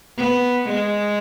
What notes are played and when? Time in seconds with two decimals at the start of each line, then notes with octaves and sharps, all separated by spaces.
0.18 B3
0.69 G#3